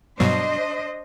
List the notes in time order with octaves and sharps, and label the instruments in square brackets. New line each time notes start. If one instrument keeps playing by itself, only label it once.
[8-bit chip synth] G2 B2 F#3 [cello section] D4 C5 D#5